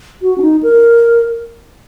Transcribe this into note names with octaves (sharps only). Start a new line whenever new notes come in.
F#4
C#4
D#4
A#4